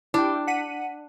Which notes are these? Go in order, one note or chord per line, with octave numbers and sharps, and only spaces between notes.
D4 E4 G4 G5
F#5 B6 D#7